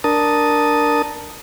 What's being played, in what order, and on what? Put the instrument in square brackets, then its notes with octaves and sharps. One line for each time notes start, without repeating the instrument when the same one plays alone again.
[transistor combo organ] D4 A#4 A5 D#6